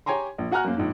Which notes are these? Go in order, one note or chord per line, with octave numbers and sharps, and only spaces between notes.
G4 C#5 G5 G#5 A#5 C6
A#1
F#4 F#5 G#5 A#5 F6 F#6
F#2 A#3
A#1 G#2